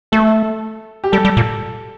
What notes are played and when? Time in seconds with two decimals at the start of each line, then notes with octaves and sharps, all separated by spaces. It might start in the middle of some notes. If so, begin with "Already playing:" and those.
0.12 A3 A4
1.04 G4
1.12 G3 A4
1.25 G3
1.37 A#2